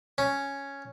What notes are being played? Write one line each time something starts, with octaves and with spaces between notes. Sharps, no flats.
C#4